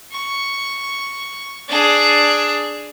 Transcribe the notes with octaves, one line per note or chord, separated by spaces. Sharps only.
C#6
D4 G#4